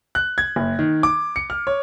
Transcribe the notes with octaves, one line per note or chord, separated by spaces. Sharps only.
F#6
G#6
F#1
D#3
D6
C#7
F6
C#5